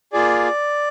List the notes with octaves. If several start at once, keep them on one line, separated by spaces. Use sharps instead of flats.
A#3 F4 G#4 D5